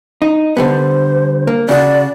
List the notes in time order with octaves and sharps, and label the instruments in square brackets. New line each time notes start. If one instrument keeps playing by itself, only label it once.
[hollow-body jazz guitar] D#4
[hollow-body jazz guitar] D3 G3 B3 [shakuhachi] C5
[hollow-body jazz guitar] A#3
[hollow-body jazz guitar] C#3 F#4 [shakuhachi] D5